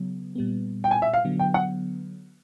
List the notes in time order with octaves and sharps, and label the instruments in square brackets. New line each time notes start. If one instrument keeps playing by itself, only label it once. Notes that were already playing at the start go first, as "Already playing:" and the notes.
Already playing: [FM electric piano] C#3 F#3 B3
A#2 G3 B3
[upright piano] G5
G#5
E5
F5
[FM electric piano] D3 F#3 B3
[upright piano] G5
F#5